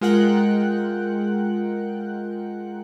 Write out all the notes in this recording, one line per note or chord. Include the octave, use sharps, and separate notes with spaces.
G#3 F4 A#4 F#5 G5 F#6